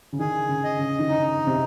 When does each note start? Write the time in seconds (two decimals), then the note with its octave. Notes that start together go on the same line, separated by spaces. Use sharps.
0.13 C#3
0.19 D#3 G#4
0.49 C#3
0.64 D#5
0.79 C#3
0.99 D#3
1.08 C#3 D#4
1.47 C3